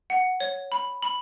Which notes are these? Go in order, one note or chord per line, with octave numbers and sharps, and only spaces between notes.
F#5
C#5
B5
B5